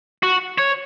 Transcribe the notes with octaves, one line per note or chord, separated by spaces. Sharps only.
F#4
C#5